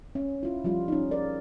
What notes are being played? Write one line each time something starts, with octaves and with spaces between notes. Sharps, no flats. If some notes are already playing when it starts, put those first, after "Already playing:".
C#4
E4 F4
F3 G3 F4
C#4 D#4
G#4 A#4 D5